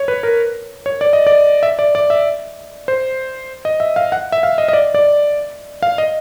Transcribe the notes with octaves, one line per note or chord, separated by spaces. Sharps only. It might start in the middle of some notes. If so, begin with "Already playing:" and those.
Already playing: C#5
B4
A#4
C#5
D5
D#5
D5
E5
D5
D5
E5
C5
D#5
E5
F5
F#5
E5
F5
D#5
D#5
D5
D5
F5
D#5